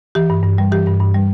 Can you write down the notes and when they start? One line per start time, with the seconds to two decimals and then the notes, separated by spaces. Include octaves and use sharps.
0.15 E3 G4
0.30 G2
0.44 G2
0.58 G3
0.72 E3 G4
0.86 G2
1.00 G2
1.14 G3